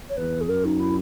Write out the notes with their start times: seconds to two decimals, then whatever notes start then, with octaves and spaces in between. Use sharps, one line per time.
0.09 C#5
0.17 E2 B4
0.40 G#4
0.48 F#2 A#4
0.64 D#4
0.79 E4